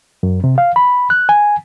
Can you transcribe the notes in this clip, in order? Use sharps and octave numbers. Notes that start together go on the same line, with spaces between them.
F#2
C3
F5
B5
F#6
G#5